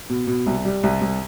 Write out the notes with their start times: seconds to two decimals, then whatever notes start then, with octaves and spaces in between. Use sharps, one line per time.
0.09 B2
0.27 B2
0.46 C2
0.65 G3
0.83 C2
1.01 C2